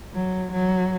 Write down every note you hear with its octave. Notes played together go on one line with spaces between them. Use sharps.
F#3
F#3